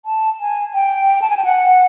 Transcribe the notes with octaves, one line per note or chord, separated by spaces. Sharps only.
A5
G#5
G5
A5
G#5
G5
F#5